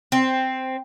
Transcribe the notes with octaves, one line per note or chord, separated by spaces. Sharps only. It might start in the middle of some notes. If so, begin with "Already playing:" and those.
C4